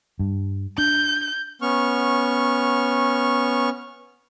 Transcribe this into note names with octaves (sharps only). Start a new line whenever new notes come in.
G2
D4 G6
B3 C#4 C#6 F6